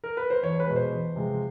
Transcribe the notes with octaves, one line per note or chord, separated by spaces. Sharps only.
A#4
B4
C5
E2 C#5
B4
B2 G#3
C5
E2
C3 F3 G#3